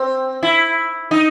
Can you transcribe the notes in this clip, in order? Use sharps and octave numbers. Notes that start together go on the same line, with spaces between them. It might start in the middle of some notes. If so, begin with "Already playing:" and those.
Already playing: C4
E4
D#4